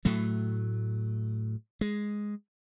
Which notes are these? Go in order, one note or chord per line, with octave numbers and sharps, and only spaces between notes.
A2 F#3 A3
G#3